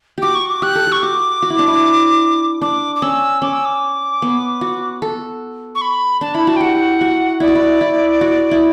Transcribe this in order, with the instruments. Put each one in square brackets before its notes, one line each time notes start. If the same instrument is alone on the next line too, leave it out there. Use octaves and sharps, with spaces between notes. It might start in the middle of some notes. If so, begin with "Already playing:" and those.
[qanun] F#4 G4 [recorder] D6
[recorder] C#6
D6
[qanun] G4 [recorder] F#6
[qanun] A4
G4
[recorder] C#6
[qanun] F#4 [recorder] D6
[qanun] F#4
E4
D4
E4
[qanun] D4 [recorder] D6
[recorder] D6
[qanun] C#4 [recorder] E6
[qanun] C#4 [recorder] D6
[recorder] E6
D6
[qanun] B3
F#4
A4
[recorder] C#6
B5
[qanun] D4 [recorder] A5
[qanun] E4 [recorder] B5
[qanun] F#4 [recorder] A5
[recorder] G5
[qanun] G4 [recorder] F#5
[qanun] F#4
[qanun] E4 [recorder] D5
[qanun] F#4
E4
E4
F#4
E4